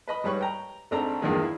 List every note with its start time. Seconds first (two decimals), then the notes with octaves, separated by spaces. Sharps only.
0.07 B4 D#5 B5
0.24 G#2 G3 B4 C#5 C#6
0.41 G5 A#5
0.91 G#1 A3 C4 D4 A4 A#5
1.22 E2 G2 A#2 D3 D#3 G#3
1.42 E4